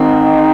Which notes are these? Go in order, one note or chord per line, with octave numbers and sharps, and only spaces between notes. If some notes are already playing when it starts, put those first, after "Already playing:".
Already playing: G#2 D#3 C4 D#4